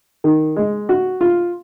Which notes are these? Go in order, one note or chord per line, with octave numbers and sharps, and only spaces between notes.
D#3
G#3
F#4
F4